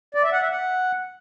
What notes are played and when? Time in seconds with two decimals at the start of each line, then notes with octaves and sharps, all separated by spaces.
0.15 D5
0.24 E5
0.33 F#5
0.42 E5
0.51 F#5